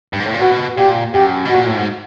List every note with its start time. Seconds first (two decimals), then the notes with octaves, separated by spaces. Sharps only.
0.13 G2
0.20 G#2
0.27 A2
0.34 A#2
0.41 B2 F#4
0.77 A#2 G4
1.14 F#2 G4
1.45 B2
1.50 F#4
1.55 A#2
1.66 A2
1.76 G#2